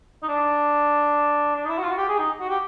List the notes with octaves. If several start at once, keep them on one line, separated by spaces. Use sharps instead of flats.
D#4
D4
D4
D#4
E4
F#4
F4
F#4
G4
G#4
D#4
F#4
G4